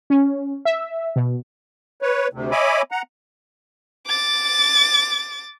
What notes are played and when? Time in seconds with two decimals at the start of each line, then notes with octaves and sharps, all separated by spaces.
0.10 C#4
0.65 E5
1.16 B2
2.02 B4 C#5
2.33 D2 C3
2.52 C#5 D#5 E5 G#5 B5 D6
2.91 F#5 A#5
4.07 D6 A6